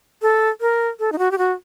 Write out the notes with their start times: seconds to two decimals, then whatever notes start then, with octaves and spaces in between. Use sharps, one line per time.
0.22 A4
0.61 A#4
0.99 A4
1.12 D#4
1.19 F#4
1.31 G4
1.38 F#4